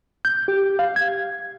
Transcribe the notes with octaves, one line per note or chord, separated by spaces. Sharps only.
G6
G4
F5
G#6